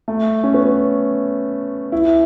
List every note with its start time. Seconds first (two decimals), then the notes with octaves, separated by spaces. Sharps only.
0.08 A3
0.44 C#4
0.54 B3
1.92 E4